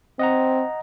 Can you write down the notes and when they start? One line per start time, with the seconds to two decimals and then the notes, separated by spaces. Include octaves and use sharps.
0.19 C4 D#5 F#5 A#5